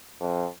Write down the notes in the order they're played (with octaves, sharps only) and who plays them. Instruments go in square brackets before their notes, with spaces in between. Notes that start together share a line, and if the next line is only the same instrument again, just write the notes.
[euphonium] F2